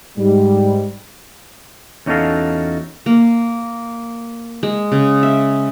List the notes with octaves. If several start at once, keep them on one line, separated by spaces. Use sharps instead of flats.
G#2 G3
E2 C#4 D#4 F#4 A4 F5
A#3
G#3
C#3
E5